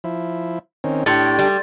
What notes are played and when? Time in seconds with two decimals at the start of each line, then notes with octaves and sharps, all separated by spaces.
0.04 F3 E4
0.84 D#3 C4 C#4
1.06 A2 D4 G4 C6 G#6 A6
1.39 G3